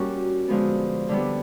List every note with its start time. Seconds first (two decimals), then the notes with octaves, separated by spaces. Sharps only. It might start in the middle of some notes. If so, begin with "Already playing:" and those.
Already playing: G3 A#3 C#4 F#4
0.48 D3 F3 G#3 B3
1.09 D3 G3 B3